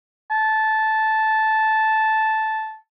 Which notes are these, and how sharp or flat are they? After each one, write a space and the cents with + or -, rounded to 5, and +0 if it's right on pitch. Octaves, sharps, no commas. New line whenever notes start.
A5 -10